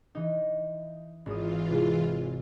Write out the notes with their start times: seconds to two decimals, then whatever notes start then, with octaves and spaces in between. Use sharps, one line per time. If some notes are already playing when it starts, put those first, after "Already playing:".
0.15 E3 D#4
1.26 G#1 E3 F4 D#6
1.70 C3 G#3